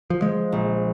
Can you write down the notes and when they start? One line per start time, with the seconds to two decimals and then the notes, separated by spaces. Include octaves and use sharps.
0.10 F3
0.22 F3 G#3
0.52 A#1